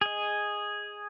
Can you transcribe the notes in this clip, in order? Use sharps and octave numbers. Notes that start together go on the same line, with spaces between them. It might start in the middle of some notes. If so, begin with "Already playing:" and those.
G#4 D#5